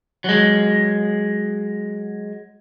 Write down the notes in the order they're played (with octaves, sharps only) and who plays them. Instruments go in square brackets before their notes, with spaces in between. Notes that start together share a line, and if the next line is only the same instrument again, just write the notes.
[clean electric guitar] F#3 G#3